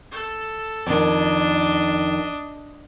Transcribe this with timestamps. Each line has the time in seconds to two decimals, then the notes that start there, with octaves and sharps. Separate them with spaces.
0.11 A4
0.87 F2 D#3 D4 D#5